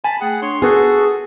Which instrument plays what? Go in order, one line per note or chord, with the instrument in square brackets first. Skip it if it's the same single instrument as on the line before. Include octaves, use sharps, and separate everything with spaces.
[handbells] G#5 [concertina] A5 B5
[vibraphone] A3 G5 [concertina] G#4 F#5
[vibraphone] D4 [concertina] C#5 C6
[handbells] B3 B4 [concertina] F#4 A4 [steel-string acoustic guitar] G#4 [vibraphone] D#6